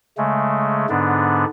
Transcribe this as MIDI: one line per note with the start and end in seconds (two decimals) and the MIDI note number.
0.18 0.86 49
0.18 0.86 56
0.18 0.86 57
0.89 1.45 44
0.89 1.45 50
0.89 1.45 59
0.89 1.45 62